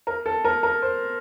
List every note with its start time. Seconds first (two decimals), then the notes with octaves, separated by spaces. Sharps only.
0.07 A#4
0.26 A4
0.44 A#4
0.63 A#4
0.82 C5